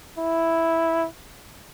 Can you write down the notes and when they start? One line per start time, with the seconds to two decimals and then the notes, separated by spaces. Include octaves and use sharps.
0.18 E4